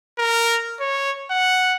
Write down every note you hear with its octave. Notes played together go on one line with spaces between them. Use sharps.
A#4
C#5
F#5